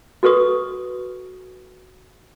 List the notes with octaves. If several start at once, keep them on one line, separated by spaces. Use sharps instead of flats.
F#4 A4 B4 C#6 D#6